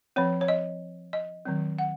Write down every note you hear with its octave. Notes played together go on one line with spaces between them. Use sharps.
F3 C4 C#5
C#5
D#5
D#5
D#3 F#3 C4
F#5